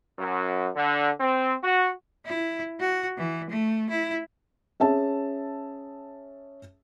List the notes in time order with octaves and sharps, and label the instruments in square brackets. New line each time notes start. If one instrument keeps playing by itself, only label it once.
[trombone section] F#2
D3
C4
F#4
[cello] E4
F#4
E3
A3
E4
[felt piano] C#4 G#4 E5 A5